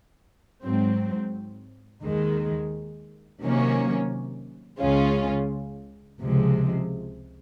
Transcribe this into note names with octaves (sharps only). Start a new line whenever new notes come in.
G#2 F#3 C4
D#2 D#3 G#3
C3 D#3 F#3 A#3 C#4
C#2 C#3 G#3 C#4 F4
C#2 C3 F3 G#3